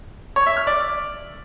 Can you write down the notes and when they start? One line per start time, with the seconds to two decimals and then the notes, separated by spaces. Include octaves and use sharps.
0.36 C#5
0.46 E5
0.57 F6
0.67 D5